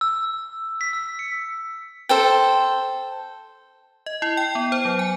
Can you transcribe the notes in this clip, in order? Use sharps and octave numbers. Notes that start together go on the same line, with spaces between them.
E6
B6
E6
C#7
A4 C5 G5
D#5
E4
G5
B3
C5
F#3
G#5